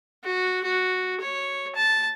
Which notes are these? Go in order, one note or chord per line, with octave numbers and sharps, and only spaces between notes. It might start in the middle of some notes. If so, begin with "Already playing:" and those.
F#4
F#4
C#5
A5